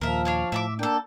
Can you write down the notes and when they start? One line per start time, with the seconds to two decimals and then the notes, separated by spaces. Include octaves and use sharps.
0.01 D#2 A#2 F3 A#4 E5
0.25 D4 C#5 F5
0.52 A2 E5 A5 D6
0.79 A#3 D4 A4 G5